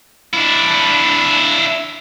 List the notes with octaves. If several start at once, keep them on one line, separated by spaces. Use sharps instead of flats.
D4 E4